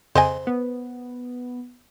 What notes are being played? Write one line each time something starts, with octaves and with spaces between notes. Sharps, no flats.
F2 C#3 C5 D#5 G#5 C6
B3